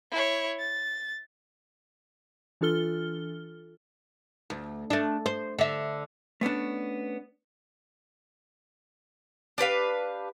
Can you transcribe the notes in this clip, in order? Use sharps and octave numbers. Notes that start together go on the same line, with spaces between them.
E4 C#5
A6
E3 D4 F4 A4 F6 G7
D2
A3 D4
C5
D3 E5
A3 B3 C#4 D4
D4 G4 B4 F5